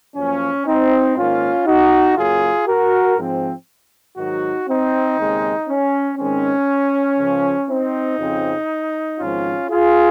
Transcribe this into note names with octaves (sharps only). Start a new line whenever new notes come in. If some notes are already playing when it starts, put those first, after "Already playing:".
F#2 F3 A#3 C#4
C4 D#4
G#2 D#3 A#3 C#4 F4
D#4 F#4
F#2 C#3 F#3 A#3 F4 G#4
F#4 A#4
G#2 F3 C4
G#2 D#3 F#3 D#4 F#4
C4 D#4
D#2 C#3 G#3 C4
C#4
G#2 D#3 G#3 C4 C#4
C#2 C#3 F3
C4 D#4
F2 C#3 F3 C4
G#1 G#2 F3 C#4 F4
F4 G#4